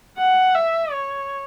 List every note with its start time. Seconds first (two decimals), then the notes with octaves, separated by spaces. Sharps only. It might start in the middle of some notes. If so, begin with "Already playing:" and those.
0.18 F#5
0.55 E5
0.92 C#5